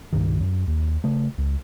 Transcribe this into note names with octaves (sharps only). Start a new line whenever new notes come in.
C2 G2 A#2 D#3
F#2
D#2
C#3 A3
C#2